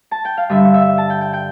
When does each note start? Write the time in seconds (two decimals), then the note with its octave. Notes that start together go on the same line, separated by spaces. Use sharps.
0.11 A5
0.25 G5
0.37 F5
0.49 G2 D3 G3 E5
0.74 E5
0.98 A5
1.10 G5
1.21 G5
1.33 G5